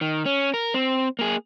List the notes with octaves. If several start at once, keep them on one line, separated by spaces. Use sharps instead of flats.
D#3
C#4
A#4
C4
A#3 G#4